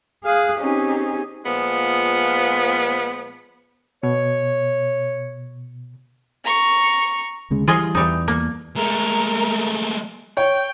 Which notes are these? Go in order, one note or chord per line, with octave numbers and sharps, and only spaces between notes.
G#4 F5 D#6 F#6
C4 C#4 D#4 G4 G#4
A#2 F3 G#3 B3
B2 C#5
A#5 C#6
D2 C#3 G#3
E3 G3 F4 G#4 D#5
E2 E3 G3 D#4
A#3
G#3 A3 A#4
C#5 G5